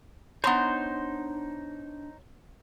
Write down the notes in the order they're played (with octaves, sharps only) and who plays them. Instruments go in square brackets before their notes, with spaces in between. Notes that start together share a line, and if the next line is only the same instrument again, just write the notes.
[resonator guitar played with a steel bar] B3 A#5 [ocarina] D4 [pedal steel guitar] D#4 C5 [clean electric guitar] C#5 C6